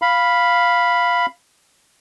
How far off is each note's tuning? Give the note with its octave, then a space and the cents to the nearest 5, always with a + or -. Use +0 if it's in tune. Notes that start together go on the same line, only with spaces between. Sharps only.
F5 +0 B5 +0